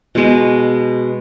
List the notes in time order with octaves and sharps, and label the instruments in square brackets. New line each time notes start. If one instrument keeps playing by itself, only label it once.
[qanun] B2 G#3 B3